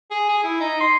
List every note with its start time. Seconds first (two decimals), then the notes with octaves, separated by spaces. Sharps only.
0.11 G#4
0.29 G#4
0.44 E4
0.60 D#4
0.81 C6